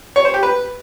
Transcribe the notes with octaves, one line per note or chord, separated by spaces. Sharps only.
C#5
C5
G4
B4